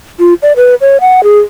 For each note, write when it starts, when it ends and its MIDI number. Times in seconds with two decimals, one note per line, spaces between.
0.20 0.34 65
0.42 0.53 74
0.56 0.75 71
0.81 0.97 73
1.01 1.23 78
1.24 1.38 68